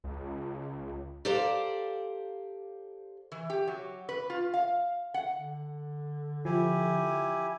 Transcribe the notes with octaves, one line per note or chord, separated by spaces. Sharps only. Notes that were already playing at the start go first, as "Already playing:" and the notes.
C#2
G4 A4 C5 D5 F5 A#5
E3
G4
F#3
B4
F4
F5
F#5
D3
F3 E4 G4 G#5